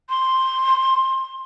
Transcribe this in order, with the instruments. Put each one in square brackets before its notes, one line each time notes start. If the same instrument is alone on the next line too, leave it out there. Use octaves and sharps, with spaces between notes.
[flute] C6